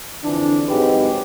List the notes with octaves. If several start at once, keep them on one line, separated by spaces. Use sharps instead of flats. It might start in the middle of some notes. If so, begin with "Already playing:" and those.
F2 D3 E3 D4
G#2 F#3 G#3 C4 G4 B4